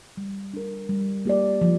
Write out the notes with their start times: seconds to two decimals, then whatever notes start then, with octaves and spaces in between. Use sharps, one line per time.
0.17 G3
0.54 D4 A#4
0.89 G3
1.25 A#3 G4 D5
1.61 F3